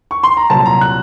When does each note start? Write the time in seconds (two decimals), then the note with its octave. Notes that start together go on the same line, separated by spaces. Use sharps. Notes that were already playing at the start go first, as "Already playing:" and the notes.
0.11 C#6
0.23 C6
0.37 A#5
0.50 C2 A#2 F#3 A5
0.66 A#5
0.81 F#6